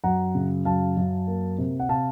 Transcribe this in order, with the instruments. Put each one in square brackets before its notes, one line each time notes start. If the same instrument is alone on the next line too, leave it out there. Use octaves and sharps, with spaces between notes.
[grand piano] F#2 F#5 A#5
C#3
F#2 F5 A5
F#2
A#3
C3
F#5
C3 F5 A5